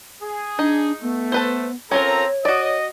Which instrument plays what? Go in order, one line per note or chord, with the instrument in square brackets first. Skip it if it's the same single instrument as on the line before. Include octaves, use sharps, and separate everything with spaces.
[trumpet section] G#4
[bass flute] D4 [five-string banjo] D#4
[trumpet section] A3 [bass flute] B3
[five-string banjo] A4 B4 C5
[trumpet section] C4 A4 A#5 [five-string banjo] C#4 F4 A#4 [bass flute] C#5
[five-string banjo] F#4 D5 [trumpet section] D#5